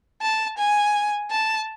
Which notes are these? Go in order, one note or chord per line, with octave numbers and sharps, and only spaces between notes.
A5
G#5
A5